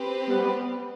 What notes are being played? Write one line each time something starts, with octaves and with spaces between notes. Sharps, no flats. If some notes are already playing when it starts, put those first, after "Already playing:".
Already playing: C4 G4 B4
G3 B3